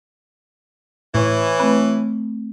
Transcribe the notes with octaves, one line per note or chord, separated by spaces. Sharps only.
A2 E3 C#4 E4 C#6
A3 C4 B4